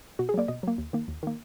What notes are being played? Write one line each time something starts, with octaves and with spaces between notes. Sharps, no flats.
B2 F#4
G#4
F#3 A#3 D5
B2 D#5
F#3 A#3
D#2
D#3 A#3
D#2
D#3 A#3